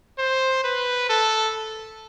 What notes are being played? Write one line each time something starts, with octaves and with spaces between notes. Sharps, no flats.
C5
B4
A4